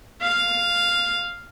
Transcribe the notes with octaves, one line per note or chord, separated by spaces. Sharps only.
F5